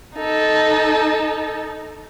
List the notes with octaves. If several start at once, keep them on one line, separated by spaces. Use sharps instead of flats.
D#4 A4